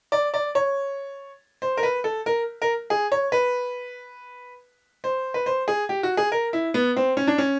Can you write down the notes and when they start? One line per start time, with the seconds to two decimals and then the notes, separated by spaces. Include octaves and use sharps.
0.12 D5
0.34 D5
0.55 C#5
1.62 C5
1.77 A#4
1.83 B4
2.04 A4
2.26 A#4
2.62 A#4
2.90 G#4
3.12 C#5
3.32 B4
5.04 C5
5.34 B4
5.46 C5
5.68 G#4
5.89 G4
6.03 F#4
6.17 G#4
6.32 A#4
6.53 E4
6.74 B3
6.96 C4
7.17 C#4
7.27 D4
7.38 C#4